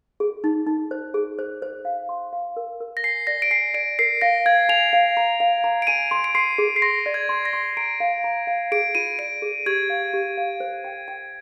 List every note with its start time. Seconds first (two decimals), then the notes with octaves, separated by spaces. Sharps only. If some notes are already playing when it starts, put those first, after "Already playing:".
0.20 G#4
0.44 D#4
0.67 D#4
0.91 C5
1.14 G#4
1.39 C5
1.62 C5
1.85 F5
2.09 C6
2.33 F5
2.57 A#4
2.80 A#4
2.97 A#6
3.04 G#5 C7
3.27 D5 A#6
3.42 D7
3.51 G#5 C7
3.74 D5 D7
3.99 A#4 C7
4.21 F5 A#6
4.46 F5 G#6
4.69 G#5 F7
4.93 F5
5.17 A#5
5.40 F5
5.64 A#5
5.82 D7
5.87 G#5 D#7
6.11 C6
6.24 D7
6.35 C6 C7
6.58 G#4
6.76 C7
6.82 C6 A#6
7.06 D5
7.14 G#6
7.29 C6
7.45 A#6
7.53 C6
7.77 A#5 D7
8.00 F5
8.24 A#5
8.47 F5
8.72 G#4 D7
8.95 F4 D#7
9.19 D5 D7
9.42 G#4
9.66 G4 G#6
9.90 F5
10.13 G4
10.37 F5
10.60 C5
10.84 G5
11.08 G5